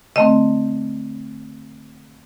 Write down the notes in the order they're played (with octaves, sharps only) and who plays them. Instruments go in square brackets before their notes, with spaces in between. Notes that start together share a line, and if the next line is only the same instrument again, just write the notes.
[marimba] D3 A3 C4 D#5